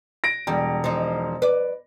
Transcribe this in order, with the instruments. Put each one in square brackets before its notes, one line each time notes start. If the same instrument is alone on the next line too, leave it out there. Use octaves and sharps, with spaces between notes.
[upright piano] A#6 D7
[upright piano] E1 [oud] G3
[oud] F3 D#4
B4 D5